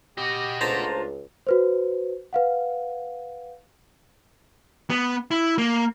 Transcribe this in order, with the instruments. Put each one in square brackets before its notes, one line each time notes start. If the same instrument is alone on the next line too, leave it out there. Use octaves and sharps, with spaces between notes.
[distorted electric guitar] F#4 D#5 [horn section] G4
[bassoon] C#2 [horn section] A3 D4 F4 [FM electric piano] C5 A5 A#5
[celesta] F#4 B4 C5
B4 F5 F#5
[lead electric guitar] B3
E4
A#3